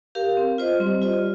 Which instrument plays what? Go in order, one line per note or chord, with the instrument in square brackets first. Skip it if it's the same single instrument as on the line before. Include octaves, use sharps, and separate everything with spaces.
[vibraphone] G4 A#4 F5
C4
F4 C5 D#5
[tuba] G3 [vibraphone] C4
[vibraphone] F4 C5 D#5